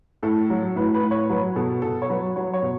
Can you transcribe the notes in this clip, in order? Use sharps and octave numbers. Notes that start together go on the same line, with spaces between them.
A2 A4
F#3
A2 B4
B4
A2
C#5
F#3 B4
B2 A4
B2 A4
C#5
F#3 B4
F#3 C#5
C#5
B2